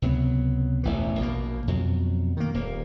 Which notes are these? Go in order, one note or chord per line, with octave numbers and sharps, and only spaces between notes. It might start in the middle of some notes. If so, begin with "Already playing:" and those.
C#2 C3 F#3 B3
E1 A1 E3
A#1 B2 A#3
F2 B2 F#3
D#3 A#3
D#1 D#2 A#3